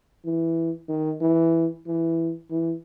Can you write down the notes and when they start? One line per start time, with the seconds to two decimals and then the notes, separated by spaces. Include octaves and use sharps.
0.25 E3
0.89 D#3
1.21 E3
1.87 E3
2.50 E3